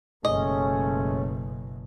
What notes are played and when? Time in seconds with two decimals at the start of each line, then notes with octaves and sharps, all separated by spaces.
0.25 F#1 B2 G#3 A3 C#4 D#5